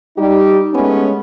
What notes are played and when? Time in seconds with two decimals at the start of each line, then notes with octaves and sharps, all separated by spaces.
0.16 G3 D#4 G4
0.73 G#3 A3 B3 C#4